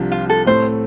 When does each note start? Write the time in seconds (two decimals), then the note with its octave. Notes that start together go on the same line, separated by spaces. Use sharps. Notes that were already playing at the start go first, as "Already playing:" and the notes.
Already playing: C2 C3 F3 D4 G4
0.12 F4
0.30 A4
0.46 A2 A3 C4 C5